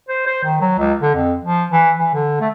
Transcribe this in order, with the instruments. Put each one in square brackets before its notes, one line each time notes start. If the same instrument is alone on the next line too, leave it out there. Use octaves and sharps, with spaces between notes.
[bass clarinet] C5
C5
D#3
F#3
C#2
D3
F2
F3
E3
E3
D3
A3